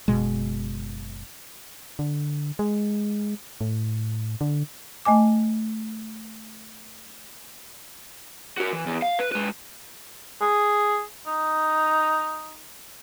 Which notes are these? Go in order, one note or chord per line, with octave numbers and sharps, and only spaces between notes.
F#1 B2 G#3
D3
G#3
A2
D3
A3 D#5 G#5 D6
F#4 A#4
E3
E2
F5
B4
G#3 B4
G#4
D#4